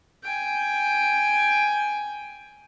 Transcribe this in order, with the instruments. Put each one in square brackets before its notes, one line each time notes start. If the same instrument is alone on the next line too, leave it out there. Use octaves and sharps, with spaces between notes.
[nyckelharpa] G5 G#5